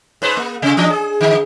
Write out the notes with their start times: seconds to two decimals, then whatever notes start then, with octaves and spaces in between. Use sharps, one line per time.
0.22 G#2 B4 C5
0.37 A#3
0.62 C3
0.77 E3 D4 D#5
0.90 G#4
1.21 D3